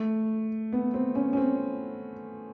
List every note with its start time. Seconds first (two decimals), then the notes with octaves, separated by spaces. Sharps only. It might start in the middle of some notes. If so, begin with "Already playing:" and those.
Already playing: A3
0.73 B3
0.94 C4
1.15 C#4
1.33 C#4
1.37 C4